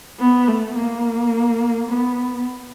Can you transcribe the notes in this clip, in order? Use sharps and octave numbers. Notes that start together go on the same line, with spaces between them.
B3
A3
A#3
B3